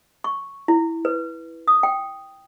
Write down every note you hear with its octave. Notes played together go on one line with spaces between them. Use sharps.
C#6
E4
B4
D#6
G5